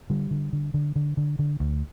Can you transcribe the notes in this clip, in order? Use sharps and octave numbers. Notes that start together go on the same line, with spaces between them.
D3 G3
D3
D3
D3
D3
D3
D3
D2